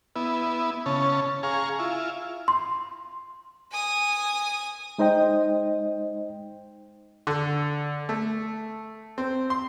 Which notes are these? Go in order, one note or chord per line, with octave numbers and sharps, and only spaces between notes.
B3 E4
C#3 C#4 A5
G#4 F5 A#5 C#6
E4 F4
C6
G#5 D#6
G#3 D#4 C5 D#5 G5
D3
A3
C4
C6